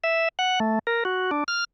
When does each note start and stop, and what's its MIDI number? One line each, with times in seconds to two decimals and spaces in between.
0.04 0.28 76
0.39 0.59 78
0.60 0.79 57
0.87 1.04 70
1.05 1.31 66
1.31 1.44 62
1.48 1.64 89